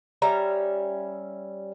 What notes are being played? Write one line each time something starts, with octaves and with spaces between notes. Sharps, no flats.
G3 C#4 E5 A#5